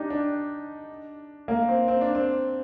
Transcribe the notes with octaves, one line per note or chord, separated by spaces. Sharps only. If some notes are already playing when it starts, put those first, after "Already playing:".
Already playing: D4 D#4 G4
D4
A#3
C4
C4
D4
C4